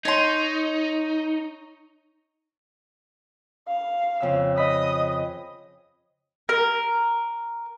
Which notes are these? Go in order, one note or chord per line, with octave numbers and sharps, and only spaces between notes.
D#4 C#5 C6
F5
F2 C#3 E6
D#5 B5 D#6
A#4